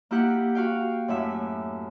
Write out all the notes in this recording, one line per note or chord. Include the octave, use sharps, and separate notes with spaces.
A#3 E4 G4 F#5
F#4 F5 G5
F#2 A2 E5